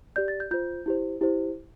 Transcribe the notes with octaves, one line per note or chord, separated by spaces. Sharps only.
G4 D5 G6
A6
G6
F4 C5 G6
E4 G4 C5
E4 G4 C5